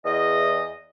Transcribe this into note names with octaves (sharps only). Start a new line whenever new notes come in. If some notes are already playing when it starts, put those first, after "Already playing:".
E2 D#5